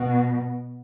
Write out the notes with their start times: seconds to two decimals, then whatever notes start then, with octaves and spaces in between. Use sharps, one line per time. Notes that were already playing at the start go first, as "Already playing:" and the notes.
Already playing: B2